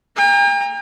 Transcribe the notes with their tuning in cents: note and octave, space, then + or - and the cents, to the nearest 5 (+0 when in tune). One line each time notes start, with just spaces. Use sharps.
G5 +45 A#5 +0